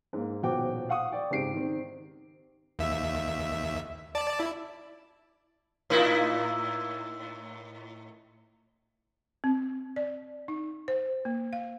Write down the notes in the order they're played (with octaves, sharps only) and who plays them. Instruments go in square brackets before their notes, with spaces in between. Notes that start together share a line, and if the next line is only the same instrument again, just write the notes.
[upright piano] G#2 A#3
D#1 B2 F3 F#4 G5 D6
F5 F#5 C#6 D#6
D5 G5
C#2 G#2 C4 G4 C7 D7
D#3 C4
[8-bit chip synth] D#2 E5
D5 A5
E4
[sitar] A2 D#4 E4
[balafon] C4
D5
D#4
C5
A#3
F5